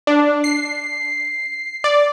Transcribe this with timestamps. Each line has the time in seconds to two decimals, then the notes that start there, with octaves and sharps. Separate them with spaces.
0.07 D4
0.44 C7
1.84 D5